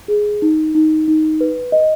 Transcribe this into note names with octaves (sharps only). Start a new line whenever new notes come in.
G#4
D#4
D#4
D#4
B4
D#5